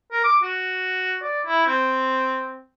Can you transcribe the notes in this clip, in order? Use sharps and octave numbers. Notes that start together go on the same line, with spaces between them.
A#4
D6
F#4
D5
E4
C4